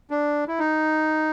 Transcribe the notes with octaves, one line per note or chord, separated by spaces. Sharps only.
D4
E4
D#4